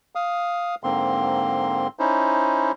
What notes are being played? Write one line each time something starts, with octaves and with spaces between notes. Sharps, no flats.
F5 D#6
G#2 D3 A#3 C4 C6
C#4 D#4 E4 C5